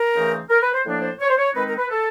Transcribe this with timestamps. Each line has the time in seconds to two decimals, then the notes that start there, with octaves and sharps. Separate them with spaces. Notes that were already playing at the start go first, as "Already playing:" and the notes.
Already playing: A#4
0.14 C#3 E3 A3 C4 D#4
0.50 A#4
0.62 B4
0.73 C5
0.85 A2 F3 A#3 D4
1.02 C5
1.20 C#5
1.29 C5
1.37 C#5
1.54 D#3 G#3 C4 D#4 B4
1.67 A#4
1.78 B4
1.90 A4